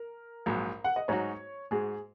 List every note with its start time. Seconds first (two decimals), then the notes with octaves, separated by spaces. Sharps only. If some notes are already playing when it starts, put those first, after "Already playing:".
Already playing: A#4
0.46 A#1 G#2 F#3
0.84 F#5
0.96 D#5
1.08 G#2 F#3 D#4 F#4 C#5
1.71 G#2 G#3 F#4 G#4